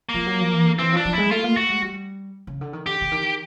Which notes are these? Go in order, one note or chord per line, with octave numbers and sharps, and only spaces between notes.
F3 A#3
F#3
F3
E3
D3
E3 C4
F3
D4
F3
G#3 E4
A3 F4
A#3
A3 F#4
G#3
G3
C#3
D3
D#3
D3 G4
D3
D#3